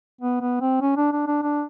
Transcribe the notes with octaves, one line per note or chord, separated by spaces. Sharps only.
B3
B3
C4
C#4
D4
D4
D4
D4